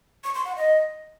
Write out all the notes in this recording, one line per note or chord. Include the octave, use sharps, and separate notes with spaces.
C#6
C6
F#5
D#5